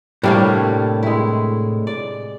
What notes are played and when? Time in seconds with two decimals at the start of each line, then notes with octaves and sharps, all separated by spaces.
0.23 A2 C3 G3 A#3 D4 C#5
1.03 G#3 E4
1.87 D5